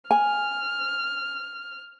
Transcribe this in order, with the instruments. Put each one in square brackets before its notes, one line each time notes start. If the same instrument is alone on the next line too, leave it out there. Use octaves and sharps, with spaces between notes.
[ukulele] G#5 [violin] F6